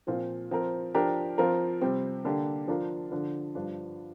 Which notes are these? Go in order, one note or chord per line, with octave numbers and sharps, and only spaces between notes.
A#2 F3 C4 F4
F3 C4 A#4
F3 D4 G4 A#4
F3 C4 F4 A#4
C3 G3 C4
D3 A#3 D4 G4
F3 D4 F4 A#4
D3 F3 D4
G2 F3 D4